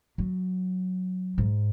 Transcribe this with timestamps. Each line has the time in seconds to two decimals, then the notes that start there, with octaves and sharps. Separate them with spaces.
0.18 F#3
1.38 G#2